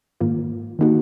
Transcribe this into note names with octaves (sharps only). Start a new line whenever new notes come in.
G#2 D#3 A#3 F4
D#3 A#3 D#4 F#4